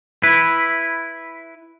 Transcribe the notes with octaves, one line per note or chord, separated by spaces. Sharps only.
E4 B4